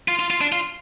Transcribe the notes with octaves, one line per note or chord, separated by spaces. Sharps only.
F4
F4
F4
D4
F4